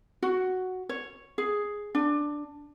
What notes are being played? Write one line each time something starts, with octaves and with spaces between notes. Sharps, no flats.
F#4
C#5
G#4
D4